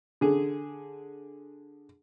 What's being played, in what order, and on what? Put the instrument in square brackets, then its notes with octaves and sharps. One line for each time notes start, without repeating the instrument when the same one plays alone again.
[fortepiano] D3 G#4